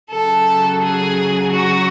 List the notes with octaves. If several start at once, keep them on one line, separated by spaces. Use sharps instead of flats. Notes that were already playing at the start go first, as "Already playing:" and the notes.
C#3 F#3 A4
G#4
F#4